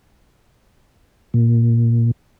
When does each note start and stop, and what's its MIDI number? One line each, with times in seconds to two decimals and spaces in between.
1.34 2.11 46